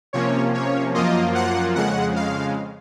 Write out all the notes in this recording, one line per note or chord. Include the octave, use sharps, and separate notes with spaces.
C3 F3 A#3 C#4 C#5
C#5
F#2 F3 A#3 F4 D#5
F#5
F2 C#3 G#3 F#5
F5